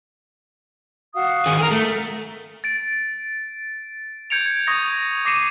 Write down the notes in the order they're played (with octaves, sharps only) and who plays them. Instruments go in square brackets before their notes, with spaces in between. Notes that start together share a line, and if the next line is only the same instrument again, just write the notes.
[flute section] F#4 F5 D#6
[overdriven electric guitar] D#3 G#4
G#4 A#4
A3
[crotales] A6 D7
G6 G#6 C#7 D7 F7
C#6 D#6 G#6 A#6
D6 A#6 C7 C#7 D#7 E7